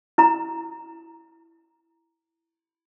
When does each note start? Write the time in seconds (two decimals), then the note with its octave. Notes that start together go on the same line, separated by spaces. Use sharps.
0.18 E4 A#5